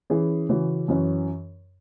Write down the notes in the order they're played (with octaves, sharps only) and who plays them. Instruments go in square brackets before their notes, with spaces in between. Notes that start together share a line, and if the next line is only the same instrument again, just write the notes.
[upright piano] E3 C#4 E4 G#4
C#3 E3 C#4 F#4
F#2 E3 C#4